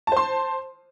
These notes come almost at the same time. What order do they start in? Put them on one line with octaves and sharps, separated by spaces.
A5 C5 C6